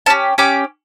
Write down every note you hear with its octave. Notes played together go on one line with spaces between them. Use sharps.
C#4 G4 A5
C#4 G4 D6